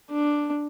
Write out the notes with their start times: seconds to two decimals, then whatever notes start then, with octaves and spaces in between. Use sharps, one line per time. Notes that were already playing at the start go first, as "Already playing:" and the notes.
0.11 D4